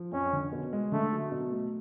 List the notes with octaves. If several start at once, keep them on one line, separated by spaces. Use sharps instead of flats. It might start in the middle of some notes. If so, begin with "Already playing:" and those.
Already playing: F3
F2 C#4
D3
B2
G#3
D3 A3
F#3
B2
A3